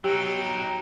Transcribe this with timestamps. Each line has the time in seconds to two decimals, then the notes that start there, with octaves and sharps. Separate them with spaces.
0.04 F#3 D#4 G4 G5